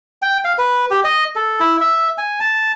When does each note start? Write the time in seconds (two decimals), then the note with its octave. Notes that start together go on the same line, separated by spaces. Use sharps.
0.22 G5
0.45 F5
0.58 B4
0.90 G4
1.04 D#5
1.35 A4
1.60 E4
1.81 E5
2.18 G#5
2.40 A5